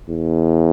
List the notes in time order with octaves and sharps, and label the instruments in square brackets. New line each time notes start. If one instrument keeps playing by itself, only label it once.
[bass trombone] E2